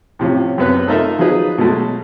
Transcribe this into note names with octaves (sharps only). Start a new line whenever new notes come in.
A2 C3 F3 C#4
F#2 C3 B3 B4 C#5
A3 D#4 F4 A4 A#4 E5
F3 F#3 D#4 G#4 B4
B2 F#3 G#3 A3